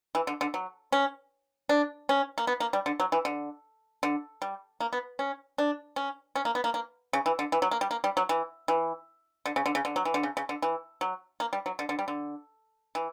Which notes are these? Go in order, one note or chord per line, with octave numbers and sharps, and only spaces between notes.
E3
D3
D3
F#3
C#4
D4
C#4
A#3
B3
A#3
G3
D3
F#3
E3
D3
D3
G3
A#3
B3
C#4
D4
C#4
C#4
A#3
B3
A#3
A#3
C#3
E3
D3
E3
F#3
A#3
G3
A#3
G3
F#3
E3
E3
D3
C#3
D3
C#3
D3
F#3
E3
D3
C#3
C#3
D3
E3
F#3
A#3
G3
F#3
D3
D3
G3
D3
E3